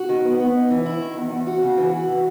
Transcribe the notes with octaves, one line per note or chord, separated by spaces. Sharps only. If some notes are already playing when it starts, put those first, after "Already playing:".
Already playing: F#4
D#3
B3
B3
D#4
E3
E4
D#3
E2
E2
F#4
C#3
E3
F#4
E3